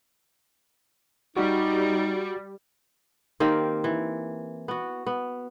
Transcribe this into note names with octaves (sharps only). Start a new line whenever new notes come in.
G3 D#4 F#4
D#3 A#3 C4 G4
E3
B3 F#4
B3